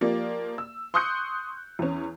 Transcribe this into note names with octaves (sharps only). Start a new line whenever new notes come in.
F3 A#3 G4 D5
E6
C6 C#6 D#6 F#6 G6 C#7
E2 C#4